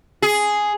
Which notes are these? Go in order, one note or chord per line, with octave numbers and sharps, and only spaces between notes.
G#4